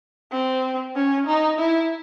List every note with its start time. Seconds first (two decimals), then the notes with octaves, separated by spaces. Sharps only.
0.32 C4
0.95 C#4
1.27 D#4
1.59 E4